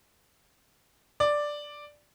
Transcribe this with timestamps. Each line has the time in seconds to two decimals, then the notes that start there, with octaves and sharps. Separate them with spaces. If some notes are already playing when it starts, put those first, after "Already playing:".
1.20 D5